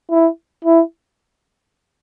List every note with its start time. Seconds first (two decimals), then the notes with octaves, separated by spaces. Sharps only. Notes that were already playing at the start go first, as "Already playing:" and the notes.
0.11 E4
0.64 E4